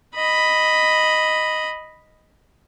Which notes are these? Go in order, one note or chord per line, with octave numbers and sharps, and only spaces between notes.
D#5 B5